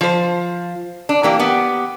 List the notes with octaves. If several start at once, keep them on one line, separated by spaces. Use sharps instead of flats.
F3 C5
D4
E3 A#3 G4
B3 G4